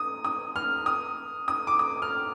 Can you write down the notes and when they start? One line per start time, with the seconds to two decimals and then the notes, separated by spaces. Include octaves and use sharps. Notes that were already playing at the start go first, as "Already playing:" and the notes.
Already playing: D#6
0.25 D#6
0.56 F6
0.86 D#6
1.48 D#6
1.67 D6
1.79 D#6
2.02 F6